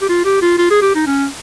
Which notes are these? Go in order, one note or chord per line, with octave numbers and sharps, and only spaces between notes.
G4
F4
G4
F4
F4
G#4
G4
D#4
C#4